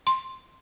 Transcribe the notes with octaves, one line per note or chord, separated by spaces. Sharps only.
C6